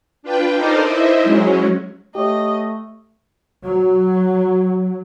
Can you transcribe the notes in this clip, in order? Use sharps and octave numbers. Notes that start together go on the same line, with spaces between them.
D4 F4 B4 G5
D#4 A4 A#4 C5 D5 D#5
E4 C5 D#5 E5
F#3 G#3 C#4
A3 G4 C#5 D#5
F#3